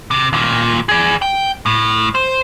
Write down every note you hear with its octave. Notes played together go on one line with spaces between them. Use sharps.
C3
D#2 A#2
G#4 D5
G5
A2
C5